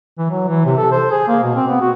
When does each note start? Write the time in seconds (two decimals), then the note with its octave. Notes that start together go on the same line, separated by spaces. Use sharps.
0.19 E3
0.31 F#3
0.48 E3
0.66 C3
0.78 A4
0.92 C5
1.11 G#4
1.28 A#3
1.43 B2
1.56 C4
1.68 B3
1.81 F#4